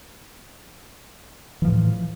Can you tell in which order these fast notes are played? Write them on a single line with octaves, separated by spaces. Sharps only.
E3 F3 A2